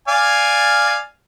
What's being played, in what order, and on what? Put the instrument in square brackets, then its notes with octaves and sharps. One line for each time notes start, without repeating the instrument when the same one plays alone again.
[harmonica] D5 F5 G#5